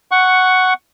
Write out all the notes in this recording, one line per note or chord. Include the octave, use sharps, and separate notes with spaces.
F#5 C#6